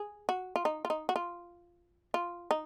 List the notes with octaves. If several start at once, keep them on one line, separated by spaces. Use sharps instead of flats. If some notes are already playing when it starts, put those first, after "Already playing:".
Already playing: G#4
F#4
F4
D#4
F4
D#4
F#4
F4
F4
D#4